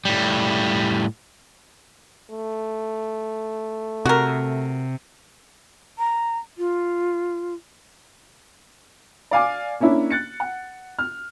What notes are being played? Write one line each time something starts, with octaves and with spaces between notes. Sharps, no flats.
A2 G3
A3
C3 F#4 A#4
A#5
F4
D5 F5 G#5 D6
A#3 C#4 D4 E4
F#6 A6 C#7
F#5
F6